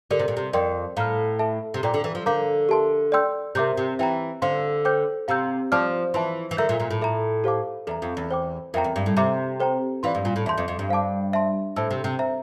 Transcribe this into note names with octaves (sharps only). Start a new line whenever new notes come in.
D3 G4 A#4 D5
C3
A#2
C3
F2 A#4 D5 G5 C6
A2 F5 A#5 F6
A4 E5 A5
C3
A#2 A4 D5 G5 A#5 D6
D3
E3
F3
D3 A#4 F5 A#5 D6 G6
G4 A#4 E5 A5 C6
D5 G5 C6 E6 G6
C3 A#4 E5 A#5 D6 G6
C3
E3 E5 G5 A#5
D3 C5 F5 C6
C5 G5 D6 G6
C3 F5 A#5 E6 G6
F3 D5 F5 A5 D6 F6
E3 E5 A5 C6
E3
D3 A#4 E5 A#5 E6 G6
A#2
A#2
A2
A4 E5 A#5
G4 C5 F5 A5 D6
E2 A4 E5 A#5
F2
E2
C5 G5 D6
F2 A#4 E5 G5 A#5
E2
G2
A2
C3 C5 E5 A#5 D6
A4 C5 G5 A#5
E3 D5 F5 C6
G2
A#2
A2
E2 E5 A5 C6 G6
F2
F2
G2
C5 F5 A5 D6
C5 E5 A5 C6
A2 C5 E5 A5 E6
C3
C3
C5 E5 A#5